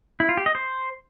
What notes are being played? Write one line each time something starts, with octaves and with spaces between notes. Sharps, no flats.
E4
F4
G4
D#5
C5